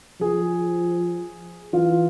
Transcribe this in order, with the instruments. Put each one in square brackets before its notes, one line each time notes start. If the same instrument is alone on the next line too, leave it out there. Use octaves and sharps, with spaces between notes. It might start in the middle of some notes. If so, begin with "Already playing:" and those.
[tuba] F3 [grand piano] G#4
[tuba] E3 [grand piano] F4